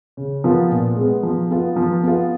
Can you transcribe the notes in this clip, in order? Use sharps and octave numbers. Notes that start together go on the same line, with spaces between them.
C#3
F3 B3 F4 A#4
A#2
G#3 B3
F3
B3 F4
F3
B3 F4